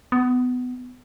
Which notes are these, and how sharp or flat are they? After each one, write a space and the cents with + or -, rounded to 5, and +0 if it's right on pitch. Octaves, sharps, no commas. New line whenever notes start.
B3 +20